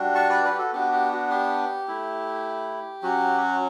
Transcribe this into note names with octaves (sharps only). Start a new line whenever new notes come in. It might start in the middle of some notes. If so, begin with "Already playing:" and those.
Already playing: G3 D4 F#4
A5 C#6
B4 D5
G4 B4
F#4 A4
B3 D4 F#4 G4
G4
F#4
G4
A3 E4
F#3 C#4 F#4